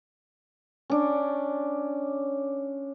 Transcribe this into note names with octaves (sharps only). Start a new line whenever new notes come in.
C#4 D4